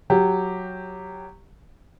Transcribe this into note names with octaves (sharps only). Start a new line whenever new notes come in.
F#3 G4